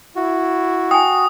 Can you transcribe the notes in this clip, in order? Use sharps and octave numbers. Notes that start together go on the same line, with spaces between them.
E4 F#4
G5 G#5 D#6